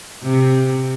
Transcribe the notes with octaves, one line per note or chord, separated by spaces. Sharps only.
C3